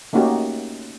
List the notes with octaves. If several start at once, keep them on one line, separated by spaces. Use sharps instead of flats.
A3 A#3 C#4 D#4 F#4 G4